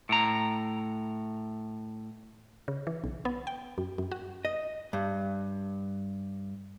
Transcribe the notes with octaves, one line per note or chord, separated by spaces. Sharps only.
A2 A#5
C#3
E3
B1
B3
G5
F#2
F#2
F#4
D#5
G2